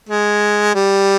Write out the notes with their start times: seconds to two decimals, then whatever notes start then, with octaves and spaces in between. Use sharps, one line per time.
0.09 G#3
0.75 G3